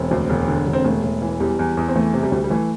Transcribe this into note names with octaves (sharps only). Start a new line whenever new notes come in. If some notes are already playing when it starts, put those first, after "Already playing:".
Already playing: E1 C4
D2
E1
D3
E1
C4
E1 A3
E1
E3
E2 G3
E2
E2
C4
E3 A3
C3
G3
D2
G3
E3 A3